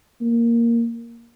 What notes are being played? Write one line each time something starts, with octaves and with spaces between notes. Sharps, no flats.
A#3